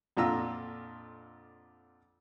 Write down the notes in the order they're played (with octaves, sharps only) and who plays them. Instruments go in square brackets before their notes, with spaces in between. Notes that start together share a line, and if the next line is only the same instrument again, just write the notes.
[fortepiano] F2 A#2 D3 F4 A#5 E6